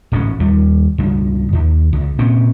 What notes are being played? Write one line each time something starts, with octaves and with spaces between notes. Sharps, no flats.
D1 A1 G#2 C#4
D#2 G3
C#2 G2
D#2
C#2
A#2 C4 C#4